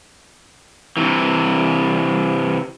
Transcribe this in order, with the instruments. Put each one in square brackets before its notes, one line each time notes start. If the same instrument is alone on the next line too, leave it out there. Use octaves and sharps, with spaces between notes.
[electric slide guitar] C3 E3